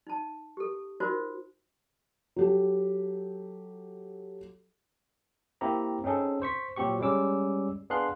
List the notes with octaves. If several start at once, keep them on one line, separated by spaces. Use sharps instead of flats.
D#4 A5
G4 A4
D#4 F4 F#4 A#4 C5
F#3 G4 A4
A#3 C4 E4 G4 A#5
C4 C#4 D#4 G#4 A4
C5 C#6 B6
A#2 F#3 C4 F#4 G4 C#6
G3 G#3 C#4 D6 E6
B3 D4 G#4 F5 C6 F#6